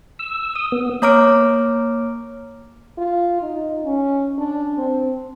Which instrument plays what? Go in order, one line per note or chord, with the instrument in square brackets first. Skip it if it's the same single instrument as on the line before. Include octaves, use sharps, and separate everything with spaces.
[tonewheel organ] E6
D#6
B3
[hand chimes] A#3 C#5 A#5 D6 F6 D7
[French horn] F4
D#4
C#4
D4
C4